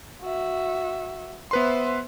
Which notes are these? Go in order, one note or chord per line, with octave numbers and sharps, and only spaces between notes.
F#4 E5
B3 B4 C5 E5 C6